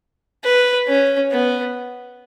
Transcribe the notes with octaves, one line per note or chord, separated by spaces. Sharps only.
B4
C#4
B3